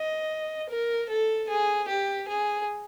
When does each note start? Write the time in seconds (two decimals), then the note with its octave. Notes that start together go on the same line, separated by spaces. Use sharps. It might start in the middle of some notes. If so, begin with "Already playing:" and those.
Already playing: D#5
0.69 A#4
1.09 A4
1.49 G#4
1.88 G4
2.28 G#4